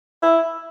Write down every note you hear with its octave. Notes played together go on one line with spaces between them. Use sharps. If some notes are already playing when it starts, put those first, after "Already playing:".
E4